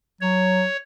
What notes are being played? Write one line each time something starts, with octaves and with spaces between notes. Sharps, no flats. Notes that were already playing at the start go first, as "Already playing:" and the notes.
F#3 C#5